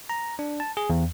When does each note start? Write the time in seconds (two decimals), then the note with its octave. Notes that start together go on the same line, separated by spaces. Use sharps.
0.10 A#5
0.39 D4
0.60 A5
0.77 G#4
0.90 E2